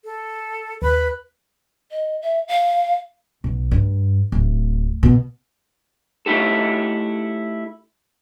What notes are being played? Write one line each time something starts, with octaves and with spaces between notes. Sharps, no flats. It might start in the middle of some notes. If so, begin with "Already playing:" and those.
A4
D#2 B4 B5
D#5
E5
F5
B1
G2
D1
B2
A3 D#4 E4 G4 A4